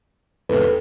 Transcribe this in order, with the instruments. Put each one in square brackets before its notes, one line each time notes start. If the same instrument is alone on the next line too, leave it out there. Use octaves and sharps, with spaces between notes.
[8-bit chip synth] E2 G#2 C3 [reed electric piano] A4 B4